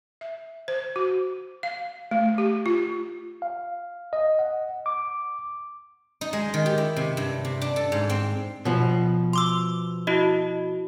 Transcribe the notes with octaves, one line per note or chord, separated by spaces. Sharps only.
E5
C5
F#4
F5
A3
G4
F4
F5
D#5
F#5
D6
D#4
G#3
D#3
G4
E4
C3
G2
C3
D4
A4
G#2
C4
B2 F3
C6 D6 E6
E4 F#4 D#5